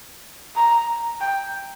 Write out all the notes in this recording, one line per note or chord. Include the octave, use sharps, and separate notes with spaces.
A#5
G5